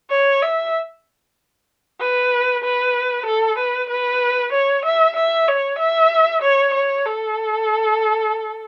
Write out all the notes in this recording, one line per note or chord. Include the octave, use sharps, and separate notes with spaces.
C#5
E5
B4
B4
A4
B4
B4
C#5
E5
E5
C#5
E5
C#5
C#5
A4